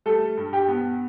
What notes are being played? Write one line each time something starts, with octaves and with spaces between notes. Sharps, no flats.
G3 A3 A4
G2
G4 G5
B3